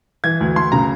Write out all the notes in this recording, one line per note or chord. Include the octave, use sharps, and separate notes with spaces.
E3 G#6
D2
D2 C6
C#3 A#5